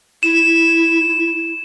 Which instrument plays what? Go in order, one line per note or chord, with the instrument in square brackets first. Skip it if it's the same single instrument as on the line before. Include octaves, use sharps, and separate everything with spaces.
[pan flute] E4 [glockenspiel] E7